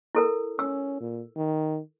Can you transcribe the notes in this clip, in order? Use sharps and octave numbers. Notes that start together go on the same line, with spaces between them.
E4 A4 A#4
C#4 E6
A#2
D#3